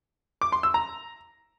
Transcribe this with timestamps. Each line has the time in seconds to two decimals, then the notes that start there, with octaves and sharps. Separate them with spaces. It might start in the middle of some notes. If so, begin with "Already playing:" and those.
0.41 D6
0.52 C6
0.63 E6
0.74 A#5